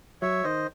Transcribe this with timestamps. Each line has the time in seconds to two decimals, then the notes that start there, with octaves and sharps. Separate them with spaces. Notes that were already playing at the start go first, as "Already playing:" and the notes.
0.22 F#3 C#5 E5
0.44 D#3 C5 D#5